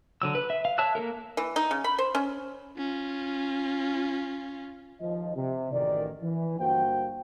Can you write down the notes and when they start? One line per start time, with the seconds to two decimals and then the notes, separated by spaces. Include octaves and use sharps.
0.22 D3 F#3 E6
0.35 B4
0.50 E5
0.65 F5
0.78 C#5 E5 A5 E6 F#6
0.95 A#3 C#4 A4 A#4
1.37 E3
1.56 D#4
1.71 C#3
1.84 B5
1.98 C5
2.15 C#4
2.78 C#4 F4
5.01 D#2 F3 D#5
5.36 C3
5.72 A1 F#2 D#3 D5
6.22 E3
6.59 G1 G2 A#3 F#4 C5 G5